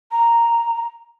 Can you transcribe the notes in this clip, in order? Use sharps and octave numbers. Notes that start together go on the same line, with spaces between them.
A#5